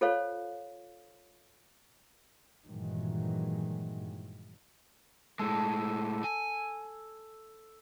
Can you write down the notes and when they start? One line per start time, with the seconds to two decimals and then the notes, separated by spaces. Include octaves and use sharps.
0.01 F4 A4 C5 C#5 F5
2.67 G2 A#2 D#3 E3 F#3 G#3
5.39 A2 G#3 A4
6.24 G#5